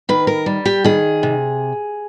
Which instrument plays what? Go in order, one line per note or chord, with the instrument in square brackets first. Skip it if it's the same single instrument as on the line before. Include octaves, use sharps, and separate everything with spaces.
[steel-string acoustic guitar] D#3 B4
A#4
G3
G4
D#3 G#4
C3